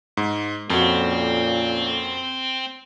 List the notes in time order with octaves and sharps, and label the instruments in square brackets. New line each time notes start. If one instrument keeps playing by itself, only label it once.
[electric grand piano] G#2
[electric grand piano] F2 F#4 [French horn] A#2 [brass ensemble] A#3 C#4 A4 [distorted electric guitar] C4